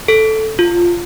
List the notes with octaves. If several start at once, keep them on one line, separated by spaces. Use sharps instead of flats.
A4
F4